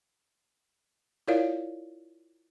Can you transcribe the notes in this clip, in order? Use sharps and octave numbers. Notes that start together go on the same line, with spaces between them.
E4 F4 A#4 C#5 D5 F5